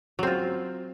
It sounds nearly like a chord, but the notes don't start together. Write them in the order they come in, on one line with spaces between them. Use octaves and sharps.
F#3 C4 F4